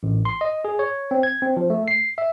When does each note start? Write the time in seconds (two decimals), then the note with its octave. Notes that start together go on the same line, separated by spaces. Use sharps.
0.03 A1
0.25 C6
0.41 D#5
0.65 G#4
0.79 C#5
1.11 C4
1.23 G#6
1.42 C4
1.57 F3
1.70 A3
1.88 C7
2.18 E5